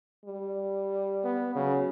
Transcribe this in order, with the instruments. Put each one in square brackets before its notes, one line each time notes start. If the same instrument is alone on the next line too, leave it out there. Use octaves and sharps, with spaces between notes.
[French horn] G3
[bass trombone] B3
[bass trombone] C#3 [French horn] F#3